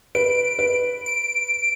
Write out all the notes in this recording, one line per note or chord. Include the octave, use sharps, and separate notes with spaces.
B4 D7
B4
D7